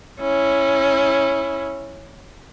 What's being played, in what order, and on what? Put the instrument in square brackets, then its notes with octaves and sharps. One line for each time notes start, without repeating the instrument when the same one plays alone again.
[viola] C#4 E4